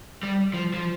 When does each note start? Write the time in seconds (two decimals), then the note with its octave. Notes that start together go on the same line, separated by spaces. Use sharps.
0.23 G3
0.54 F3
0.74 F3